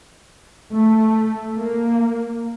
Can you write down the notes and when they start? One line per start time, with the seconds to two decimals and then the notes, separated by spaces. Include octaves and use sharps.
0.74 A3
1.57 A#3